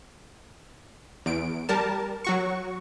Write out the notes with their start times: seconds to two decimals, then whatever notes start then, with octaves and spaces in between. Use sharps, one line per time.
1.26 E2 D7
1.69 G3 A#4 A5
2.24 F#3 F#4 C#6